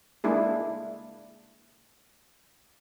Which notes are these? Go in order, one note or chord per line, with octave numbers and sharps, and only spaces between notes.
G#3 A#3 D4 E4 G#4